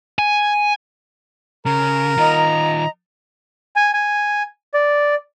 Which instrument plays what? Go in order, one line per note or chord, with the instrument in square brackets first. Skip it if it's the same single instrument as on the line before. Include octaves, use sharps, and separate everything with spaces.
[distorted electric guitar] G#5
[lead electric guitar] C#3 [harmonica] A#4
[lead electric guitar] D#3 F4 [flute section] D#5 A#5
[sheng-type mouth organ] G#5
G#5
D5